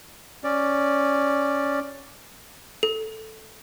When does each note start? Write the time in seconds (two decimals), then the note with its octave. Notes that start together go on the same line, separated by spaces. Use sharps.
0.44 C#4 D5
2.83 A4